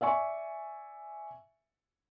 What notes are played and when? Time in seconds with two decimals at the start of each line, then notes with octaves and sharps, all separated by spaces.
0.01 D5 E5 G#5 C#6